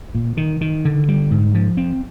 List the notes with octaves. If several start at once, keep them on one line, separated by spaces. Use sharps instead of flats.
A#2
D#3
D#3
D3
G3
G#2
F3
C4